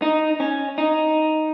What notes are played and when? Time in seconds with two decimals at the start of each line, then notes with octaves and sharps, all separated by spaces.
0.02 D#4
0.40 C#4
0.78 D#4